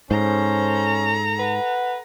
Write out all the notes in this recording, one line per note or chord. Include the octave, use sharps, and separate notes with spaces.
G#2 C#4 A4 C5 A#5
B4 F#5